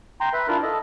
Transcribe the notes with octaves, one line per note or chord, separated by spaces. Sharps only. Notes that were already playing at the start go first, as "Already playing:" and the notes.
G5 A#5 C6
B4 E5
D4 E4 F4 A#4
A4 D#5